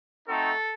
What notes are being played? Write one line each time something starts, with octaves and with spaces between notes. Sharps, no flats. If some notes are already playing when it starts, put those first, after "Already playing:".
A3 C4 D#4 F#4 A4